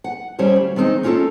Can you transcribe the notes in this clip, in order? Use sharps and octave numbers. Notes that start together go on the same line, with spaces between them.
F#5
G3 C#4 C5 C#5
D2
D#3 G#3 C4 C#4 D#4
A#3 C#4 F4 G4 A4